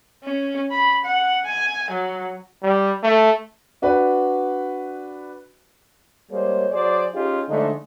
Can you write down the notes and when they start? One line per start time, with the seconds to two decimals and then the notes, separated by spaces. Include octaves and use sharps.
0.24 C#4
0.71 B5
1.05 F#5
1.45 G#5
1.91 F#3
2.63 G3
3.03 A3
3.82 D4 F#4 B4
6.31 G3 G#3 A#3 G#4 C5 C#5
6.71 F#3 G#4 C5 D5
7.14 C#4 D#4 F4 G4 G#4
7.48 D3 F3 G#3 A3 D4 D#4